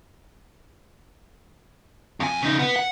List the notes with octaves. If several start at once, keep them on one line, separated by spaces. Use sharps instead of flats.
F2 G#5
C#3 D#4
B3
F#5